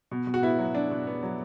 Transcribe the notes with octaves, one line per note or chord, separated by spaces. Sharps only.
B2
B2
F#4
B3 E4
F#3
B2 D4
B2
B3
F#3